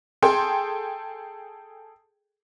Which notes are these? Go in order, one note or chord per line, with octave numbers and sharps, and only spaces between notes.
G#4 A4 G5 C6